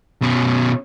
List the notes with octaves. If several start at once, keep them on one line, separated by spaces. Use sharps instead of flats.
B2 C#4